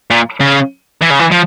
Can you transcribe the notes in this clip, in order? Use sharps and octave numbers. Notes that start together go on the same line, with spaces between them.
A#2
C#3
E3
C#3
E3
F3